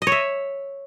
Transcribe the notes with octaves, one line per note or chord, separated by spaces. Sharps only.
D#5
C#5
E5